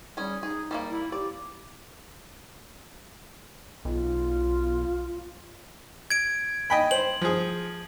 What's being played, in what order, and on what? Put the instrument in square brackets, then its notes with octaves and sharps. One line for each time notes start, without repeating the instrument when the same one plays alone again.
[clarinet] G3 [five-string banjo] C#4 G#4
[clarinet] D#4 [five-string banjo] G#4
[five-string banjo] G3 A3 A#3
[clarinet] E4
[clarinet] G4 [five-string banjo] D5
[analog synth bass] B1 [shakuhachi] F4
[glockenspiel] G#6 D7
[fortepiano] D#5 G5 B5
[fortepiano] C5 [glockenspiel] F#7
[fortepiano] F3 G#4